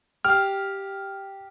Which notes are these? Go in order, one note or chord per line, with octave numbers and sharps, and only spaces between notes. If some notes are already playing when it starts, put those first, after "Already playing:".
G4 F5 F6